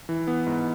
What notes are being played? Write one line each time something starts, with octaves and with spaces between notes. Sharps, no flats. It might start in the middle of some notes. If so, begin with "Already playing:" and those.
E3
B3
G#2